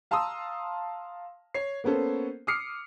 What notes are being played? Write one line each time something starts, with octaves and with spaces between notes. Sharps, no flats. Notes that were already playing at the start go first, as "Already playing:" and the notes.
F5 A5 A#5 C6 D#6 E6
C#5 C7
A#3 B3 C#4 A4 C5
D6 D#6 F6 C7 C#7